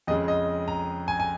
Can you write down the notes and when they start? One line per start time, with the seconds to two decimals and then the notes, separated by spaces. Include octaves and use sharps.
0.07 F2 C#3 G#3 D#5
0.28 D#5
0.68 A#5
1.08 G#5
1.20 G#5